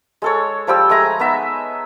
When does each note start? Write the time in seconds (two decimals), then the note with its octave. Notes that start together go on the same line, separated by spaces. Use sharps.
0.22 G#3 A4 C#5
0.67 F3 G3 G5 E6
0.89 G#3 A3 G#5 A#5
1.19 B3 D#4 E5